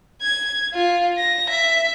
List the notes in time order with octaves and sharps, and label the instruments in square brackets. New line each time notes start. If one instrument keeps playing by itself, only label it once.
[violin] G#6
F4
A#6
E5